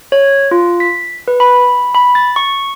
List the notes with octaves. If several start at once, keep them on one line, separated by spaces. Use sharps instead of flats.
C#5
F4
B6
B4
B5
B5
A6
C#6